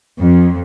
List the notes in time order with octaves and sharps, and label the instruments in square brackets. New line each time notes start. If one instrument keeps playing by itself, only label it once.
[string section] F2